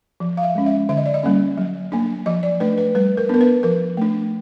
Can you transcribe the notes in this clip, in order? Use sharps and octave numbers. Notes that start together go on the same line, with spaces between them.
F3
F5
E5
G#3 C#4
E5
D3 E5
D#5
D5
D#5
G3 A#3 C#4
F#3
A#3 D4
F3 D#5
D5
A3 D4 B4
B4
G3 B4
A#4
B3 D4 A#4
B4
F3 A#4
A3 D4